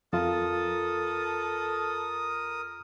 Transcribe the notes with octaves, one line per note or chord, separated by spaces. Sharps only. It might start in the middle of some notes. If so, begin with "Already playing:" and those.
F2 F4 A4 A#4 D#6